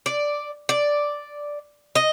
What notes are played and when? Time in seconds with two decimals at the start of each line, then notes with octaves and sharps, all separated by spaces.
0.06 D5
0.69 D5
1.95 D#5